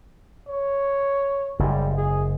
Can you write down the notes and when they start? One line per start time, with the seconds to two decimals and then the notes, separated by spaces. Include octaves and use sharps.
0.48 C#5
1.59 F#1 G#2 G3
1.96 G#4